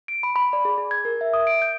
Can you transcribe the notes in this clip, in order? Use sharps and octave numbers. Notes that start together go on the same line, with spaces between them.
D7
B5
B5
D5
G#4
G#4
G#6
A#4
E5
D#6
D7
G6